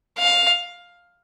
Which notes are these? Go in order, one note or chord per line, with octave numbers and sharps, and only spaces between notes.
F5